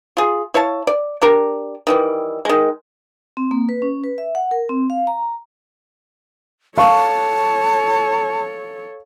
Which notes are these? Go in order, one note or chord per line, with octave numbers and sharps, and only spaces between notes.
F4 G#4
E4 C#5 F5 A5
D5
D4 G4 A#4
D#3 E3 G3
D#3 G#3
C4
A#3
B4
C#4
B4
E5
F#5
A#4
C4
F5
A#5
A4 C#5 F5 A5 C#6